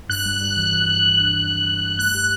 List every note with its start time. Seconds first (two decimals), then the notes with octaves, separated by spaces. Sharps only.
0.09 G2 F#6
0.26 G3
0.41 G3
0.57 E3
0.73 E3
0.88 G2
1.04 E3
1.20 D4
1.36 E3
1.52 G3
1.68 G3
1.83 G2
1.99 A3 F#6
2.15 G4